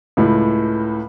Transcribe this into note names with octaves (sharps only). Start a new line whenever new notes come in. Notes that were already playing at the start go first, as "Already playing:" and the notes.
C#2 A2